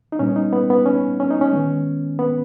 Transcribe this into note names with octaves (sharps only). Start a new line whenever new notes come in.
D#4
A#2 G3 B3 C#4
D#4
B3
B3
C#4
C#4
D#4
C#4
D#3 G#3 B3
B3